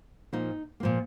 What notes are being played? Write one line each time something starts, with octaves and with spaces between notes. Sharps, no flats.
A#2 F3 A#3 D#4
A#2 F3 A#3